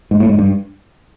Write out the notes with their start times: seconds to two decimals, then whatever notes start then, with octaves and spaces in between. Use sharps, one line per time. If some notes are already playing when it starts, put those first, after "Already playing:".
0.11 G#2
0.20 A2
0.29 G#2
0.39 G2